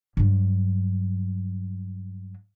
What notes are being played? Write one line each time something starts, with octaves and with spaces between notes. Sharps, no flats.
G2 F#3